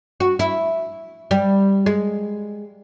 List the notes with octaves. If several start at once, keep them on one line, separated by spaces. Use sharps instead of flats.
F#4
E4
G3
G#3